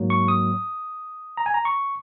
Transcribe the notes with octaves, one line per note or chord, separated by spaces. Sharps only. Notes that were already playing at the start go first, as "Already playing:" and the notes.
Already playing: G#2 F#3 A#3
C#6
D#6
A#5
G#5
A#5
C#6